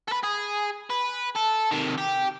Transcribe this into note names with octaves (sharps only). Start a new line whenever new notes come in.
A4 B4
G#4
B4
A4
C3 D#3
G4